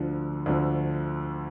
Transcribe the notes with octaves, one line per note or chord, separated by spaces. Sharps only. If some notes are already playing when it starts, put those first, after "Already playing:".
Already playing: D2 D3 F3
D2 D3 F3